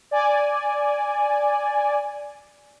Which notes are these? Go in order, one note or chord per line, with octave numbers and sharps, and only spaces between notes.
D5 G#5